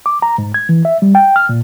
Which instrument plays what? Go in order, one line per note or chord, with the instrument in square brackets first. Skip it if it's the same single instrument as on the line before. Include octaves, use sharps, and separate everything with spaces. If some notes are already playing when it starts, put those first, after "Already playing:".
[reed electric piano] D6
A#5
G#2
G#6
E3
E5
G3
G5
F6
A#2